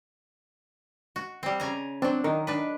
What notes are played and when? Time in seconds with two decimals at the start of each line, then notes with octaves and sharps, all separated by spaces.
1.16 F#4
1.43 G3 C4
1.60 C#3 G#5 A#5
2.02 F#3 C4 D4
2.24 D#3 D#4 A#4
2.47 D4 B4